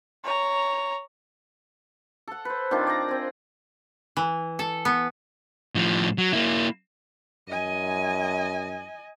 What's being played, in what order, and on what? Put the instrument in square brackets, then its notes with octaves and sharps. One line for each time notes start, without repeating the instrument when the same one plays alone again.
[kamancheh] C#5 A#5
[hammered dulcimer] A4 F#5
B4 C5
D#3 C4 D4 F4
D5 A#5
C4 G#5
[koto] E3
A4
B3
[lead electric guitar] A2 F3
F#3
A#3 E4
[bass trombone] F#2 [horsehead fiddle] D#5 G#5